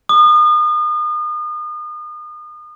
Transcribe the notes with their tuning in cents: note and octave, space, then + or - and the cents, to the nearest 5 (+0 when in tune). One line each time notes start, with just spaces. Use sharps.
D#6 -35